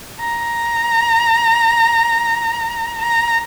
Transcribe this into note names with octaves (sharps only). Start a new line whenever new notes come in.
A#5
A#5